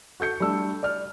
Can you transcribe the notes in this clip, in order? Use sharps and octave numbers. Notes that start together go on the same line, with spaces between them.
F#4 A4 G6 C#7
G3 A3 D4 E6
D5 F6